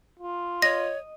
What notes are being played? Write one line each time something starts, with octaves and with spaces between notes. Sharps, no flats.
F4
C#5 D#5 A#6